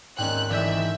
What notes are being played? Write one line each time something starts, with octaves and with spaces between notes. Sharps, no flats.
D#2 G#2 D#3 C4 C#4 D5 G5 F#6
G#1 E2 D3 D#3 D5 E5 G6